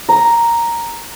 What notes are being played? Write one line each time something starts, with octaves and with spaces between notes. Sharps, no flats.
A#5